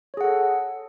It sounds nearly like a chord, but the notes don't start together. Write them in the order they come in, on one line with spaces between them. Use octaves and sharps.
C#5 G#4 F#5 A4